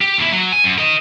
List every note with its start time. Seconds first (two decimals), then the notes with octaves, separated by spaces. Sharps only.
0.01 G4
0.18 D#2 E4
0.32 F#3
0.52 G#5
0.64 F#2
0.78 A#4 D#5